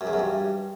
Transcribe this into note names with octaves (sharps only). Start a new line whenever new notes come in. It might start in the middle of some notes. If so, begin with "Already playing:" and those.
F#2
E2
F#2
G2